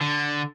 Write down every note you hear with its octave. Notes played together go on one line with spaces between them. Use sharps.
D3